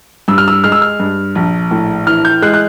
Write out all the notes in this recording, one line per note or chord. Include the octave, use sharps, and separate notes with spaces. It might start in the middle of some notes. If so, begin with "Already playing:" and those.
G2 E6
F6
E6
G#3 F6
E6
F6
G2
A#1
A2
E3 F6
G6
G#3 F#6
F#6